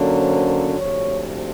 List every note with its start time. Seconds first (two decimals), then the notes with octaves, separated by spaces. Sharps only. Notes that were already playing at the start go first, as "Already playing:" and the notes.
Already playing: D3 F#3 A#3 C#4
0.18 C5
0.78 D2 C3 F3 C#5